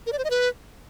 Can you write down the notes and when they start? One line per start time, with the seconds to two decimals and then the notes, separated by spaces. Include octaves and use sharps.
0.06 A#4
0.12 D5
0.18 C5
0.24 D#5
0.30 B4